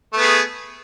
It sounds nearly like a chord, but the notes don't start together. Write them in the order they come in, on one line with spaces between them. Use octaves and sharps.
A3 B3 G#4